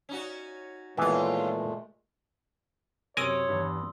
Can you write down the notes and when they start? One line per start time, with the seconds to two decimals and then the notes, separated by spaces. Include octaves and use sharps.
0.09 C#4 D#4 F#4
0.97 D#2 A#2 E3 G#3 A3 B3 F4
3.17 F#2 C3 A#4 C#5 G#5 C6 D#6 E6
3.49 E2 G2